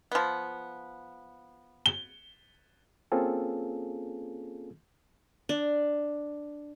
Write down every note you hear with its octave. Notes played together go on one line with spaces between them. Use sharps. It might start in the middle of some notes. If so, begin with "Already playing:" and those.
F3 B3
G7
A#3 C4 C#4 F4 G#4 A4
D4